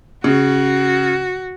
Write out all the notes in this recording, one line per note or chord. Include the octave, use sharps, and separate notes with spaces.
C#3 F#4